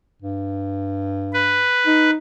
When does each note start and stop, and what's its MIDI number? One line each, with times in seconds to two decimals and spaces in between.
0.22 1.72 43
1.33 2.10 71
1.86 2.15 63